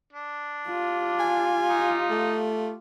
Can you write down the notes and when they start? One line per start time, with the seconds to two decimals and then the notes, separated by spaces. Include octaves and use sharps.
0.13 D4
0.68 F4 G4
1.20 G#5
1.69 D#4
2.10 A3